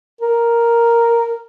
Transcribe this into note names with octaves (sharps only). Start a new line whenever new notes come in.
A#4